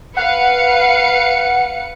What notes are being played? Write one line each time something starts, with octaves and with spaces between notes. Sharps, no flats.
B4 F5 F#5 C#7